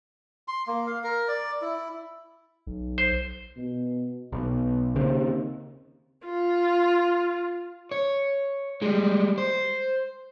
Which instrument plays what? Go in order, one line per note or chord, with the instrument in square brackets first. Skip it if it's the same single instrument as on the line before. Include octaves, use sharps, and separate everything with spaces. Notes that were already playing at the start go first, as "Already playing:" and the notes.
[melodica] C6
A#3
F5
A#4
D5
E4
[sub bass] B1
[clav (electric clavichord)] C5
[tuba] B2
[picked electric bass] B1 [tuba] B3
[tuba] D#2 [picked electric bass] C#3 C4
[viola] F4
[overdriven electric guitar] C#5
G3 G#3
C5